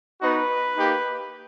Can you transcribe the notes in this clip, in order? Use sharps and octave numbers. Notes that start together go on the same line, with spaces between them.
B3 D#4 F#4 B4
A#3 D#4 G4